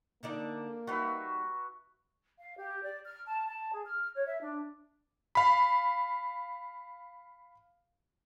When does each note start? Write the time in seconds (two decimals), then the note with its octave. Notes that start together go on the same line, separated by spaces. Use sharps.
0.23 D3 A#3 D#4 D5
0.87 G3 D#4 F#4 B4 E5
2.38 F5
2.57 G4
2.83 D5
3.04 F6
3.27 A5
3.47 A5
3.73 G#4
3.85 F6
4.15 C#5
4.27 E5
4.40 D4
5.35 F5 B5